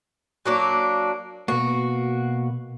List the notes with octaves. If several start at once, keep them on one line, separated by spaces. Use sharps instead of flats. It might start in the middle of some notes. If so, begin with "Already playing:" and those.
F#3 A#3 D4
B2 A#3 F#4